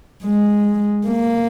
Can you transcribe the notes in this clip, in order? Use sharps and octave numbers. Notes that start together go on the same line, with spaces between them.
G#3
A#3